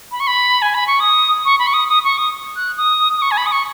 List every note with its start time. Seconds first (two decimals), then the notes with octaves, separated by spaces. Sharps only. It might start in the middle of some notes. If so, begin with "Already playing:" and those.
0.12 B5
0.20 C#6
0.27 B5
0.62 G#5
0.74 B5
0.87 C#6
1.00 D#6
1.45 C#6
1.59 B5
1.67 C#6
1.74 D#6
1.89 D#6
2.04 C#6
2.18 D#6
2.56 F#6
2.77 D#6
3.18 D#6
3.22 C#6
3.31 G#5
3.37 B5
3.46 D#6
3.52 C#6